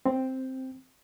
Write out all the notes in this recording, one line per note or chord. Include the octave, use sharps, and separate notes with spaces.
C4